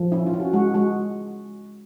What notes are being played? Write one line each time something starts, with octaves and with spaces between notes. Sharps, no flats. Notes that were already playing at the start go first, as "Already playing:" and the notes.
Already playing: F3
C#4 E4
F4
C#4
F#4
G#3 F#4
G#3 F#4